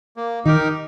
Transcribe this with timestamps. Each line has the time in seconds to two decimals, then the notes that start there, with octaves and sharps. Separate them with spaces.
0.16 A#3
0.45 D#3 D#4 G4 A#4